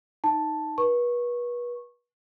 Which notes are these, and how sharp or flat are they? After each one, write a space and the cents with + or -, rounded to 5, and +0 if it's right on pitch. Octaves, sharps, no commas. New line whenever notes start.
D#4 +0 A5 +0
B4 -35 C#6 -15